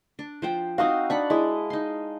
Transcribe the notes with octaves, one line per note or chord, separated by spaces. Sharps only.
D4
F3 C5 G5
C4 D#4 F#4 F5 D#6
D4 F#5 B5 C#6
G#3 E4 D#5
D#4 C6